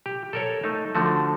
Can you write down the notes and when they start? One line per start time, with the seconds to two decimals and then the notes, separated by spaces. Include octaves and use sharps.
0.06 G4
0.33 A4 A#4 C#5
0.64 A3 D#4
0.95 D3 F3 A3 F#4